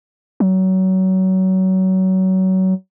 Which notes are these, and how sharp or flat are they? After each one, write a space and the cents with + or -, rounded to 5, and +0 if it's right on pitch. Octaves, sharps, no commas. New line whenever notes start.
F#3 +25